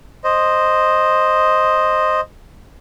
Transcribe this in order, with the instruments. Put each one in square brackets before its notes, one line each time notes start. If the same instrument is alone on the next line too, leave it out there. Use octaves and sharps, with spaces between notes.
[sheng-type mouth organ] C5 D#5